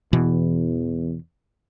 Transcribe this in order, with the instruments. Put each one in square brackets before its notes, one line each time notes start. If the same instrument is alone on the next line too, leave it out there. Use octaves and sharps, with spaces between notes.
[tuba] E2 [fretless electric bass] B2 E3